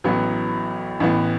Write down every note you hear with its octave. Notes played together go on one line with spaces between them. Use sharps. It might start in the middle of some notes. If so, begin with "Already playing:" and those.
A1 A2 F#3 B3 E4
A1 A2 E3 B3